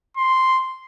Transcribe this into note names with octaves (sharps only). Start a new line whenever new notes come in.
C6